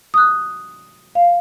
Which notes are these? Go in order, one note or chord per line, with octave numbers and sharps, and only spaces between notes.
D#6 F#6
F5